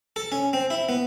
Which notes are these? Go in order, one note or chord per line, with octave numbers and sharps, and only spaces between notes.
A4
C#4
C4
E4
B3